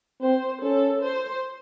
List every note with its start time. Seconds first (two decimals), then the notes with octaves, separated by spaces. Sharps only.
0.22 C4 C5
0.62 C#4 A4
1.02 C5